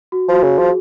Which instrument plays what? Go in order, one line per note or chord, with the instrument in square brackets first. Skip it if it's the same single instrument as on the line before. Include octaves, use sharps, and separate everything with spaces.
[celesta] F#4
[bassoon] F3 [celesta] F#4
[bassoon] C#3 [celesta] G#4
[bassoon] F3